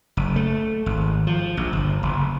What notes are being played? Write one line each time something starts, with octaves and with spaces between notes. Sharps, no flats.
F#1
A3
G#1
F3
A#1
G1
F#1